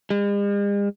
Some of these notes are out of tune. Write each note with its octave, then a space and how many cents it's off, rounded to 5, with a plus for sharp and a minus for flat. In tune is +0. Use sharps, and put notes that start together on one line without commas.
G#3 -45